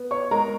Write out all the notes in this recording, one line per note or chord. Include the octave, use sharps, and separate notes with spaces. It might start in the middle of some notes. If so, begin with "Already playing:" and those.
Already playing: B3
C#5 C#6
G#3 A#4 A#5